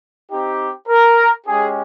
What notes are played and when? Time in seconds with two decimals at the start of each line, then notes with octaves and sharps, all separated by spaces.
0.31 C4 D#4 G4
0.89 A#4
1.46 G#3 C#4 G4 G#4